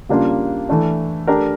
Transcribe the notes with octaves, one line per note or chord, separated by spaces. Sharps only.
C#3 G3 A#3 D4 F4
E3 A3 D4
A3 D4 G4 A#4